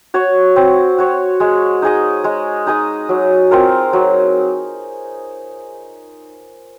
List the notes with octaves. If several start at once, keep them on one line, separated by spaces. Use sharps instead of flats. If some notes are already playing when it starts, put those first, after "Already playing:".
F#4 C#5
C4
F#4 C#5
G#3
D#4 G#4 D#5
G#3
D#4 G#4 D#5
F#3
C4 F4 A#4
F#3